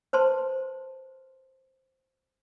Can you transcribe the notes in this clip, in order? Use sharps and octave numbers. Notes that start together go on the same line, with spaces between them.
B4 C5 A5 C6